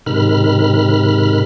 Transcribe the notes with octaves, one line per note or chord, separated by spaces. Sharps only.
G#2 C3 D#3 B5 F6